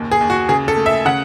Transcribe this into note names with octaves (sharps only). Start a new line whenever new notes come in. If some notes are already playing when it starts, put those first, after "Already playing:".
Already playing: F#1 D#2
G#4
D#2
F#4
C#3 G#4
A4
A3
E5
C#3 F#5